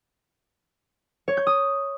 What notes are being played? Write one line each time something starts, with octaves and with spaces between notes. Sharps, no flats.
C#5
G6
D#6